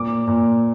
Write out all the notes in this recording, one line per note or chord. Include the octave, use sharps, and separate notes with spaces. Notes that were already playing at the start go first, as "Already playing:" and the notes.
Already playing: A#2 D6
A#2